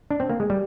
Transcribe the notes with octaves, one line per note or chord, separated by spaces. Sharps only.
D4
C4
A#3
G#3
G3